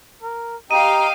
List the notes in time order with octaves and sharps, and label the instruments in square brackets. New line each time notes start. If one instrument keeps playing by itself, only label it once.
[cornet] A#4
[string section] G4 F5 G5 [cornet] D#5 [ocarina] A#5 [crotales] D#7